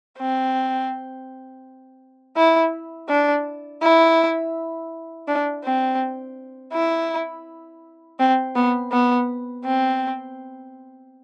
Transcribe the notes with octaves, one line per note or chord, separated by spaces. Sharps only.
C4
E4
D4
E4
D4
C4
E4
C4
B3
B3
C4